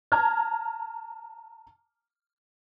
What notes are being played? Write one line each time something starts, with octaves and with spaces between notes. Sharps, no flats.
A5 A#5 F6 G#6